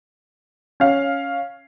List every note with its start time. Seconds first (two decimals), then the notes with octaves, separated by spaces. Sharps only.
0.80 C#4 F5